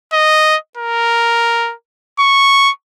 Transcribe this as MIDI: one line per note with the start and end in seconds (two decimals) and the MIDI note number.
0.13 0.57 75
0.78 1.74 70
2.20 2.71 85